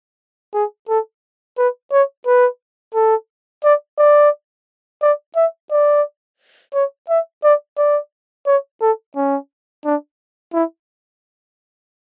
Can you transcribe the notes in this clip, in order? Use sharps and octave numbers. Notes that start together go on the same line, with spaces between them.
G#4
A4
B4
C#5
B4
A4
D5
D5
D5
E5
D5
C#5
E5
D5
D5
C#5
A4
C#4
D4
E4